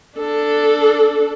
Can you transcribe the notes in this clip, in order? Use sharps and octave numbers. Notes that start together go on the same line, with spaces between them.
D4 A4